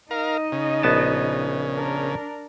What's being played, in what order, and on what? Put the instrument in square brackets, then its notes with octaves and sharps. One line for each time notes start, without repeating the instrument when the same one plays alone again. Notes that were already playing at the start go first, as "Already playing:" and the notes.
[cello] D#4 D#5 [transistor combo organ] A#4 F5
[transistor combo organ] C#3
[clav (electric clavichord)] A#1 B3 A5
[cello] D4 A#4